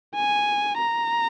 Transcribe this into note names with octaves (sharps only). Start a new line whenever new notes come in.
G#5
A#5